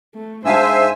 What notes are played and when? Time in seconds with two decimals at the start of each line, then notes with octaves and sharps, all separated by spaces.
0.15 A3
0.45 G#2 D4 C5 E5 F5 G#5 A5 E6